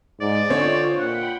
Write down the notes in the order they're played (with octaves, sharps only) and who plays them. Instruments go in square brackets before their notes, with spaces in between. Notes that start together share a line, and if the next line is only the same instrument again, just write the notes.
[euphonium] G#2 [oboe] D5 [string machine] D#5 G#5
[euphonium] D3 [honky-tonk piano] C4 C#5 [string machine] F4
[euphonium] A#2 [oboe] F#5 [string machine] G5 B5